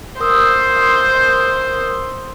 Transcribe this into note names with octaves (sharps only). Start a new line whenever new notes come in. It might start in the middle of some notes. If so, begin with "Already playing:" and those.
A#4 C5 D#6 E6